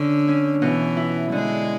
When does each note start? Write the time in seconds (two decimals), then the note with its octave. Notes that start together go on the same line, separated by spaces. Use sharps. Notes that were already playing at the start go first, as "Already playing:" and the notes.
Already playing: D3 C#4
0.28 C#4
0.62 B2 E3
0.97 E4
1.32 D3 G#3